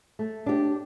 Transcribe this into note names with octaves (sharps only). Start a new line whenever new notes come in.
A3
D4 G4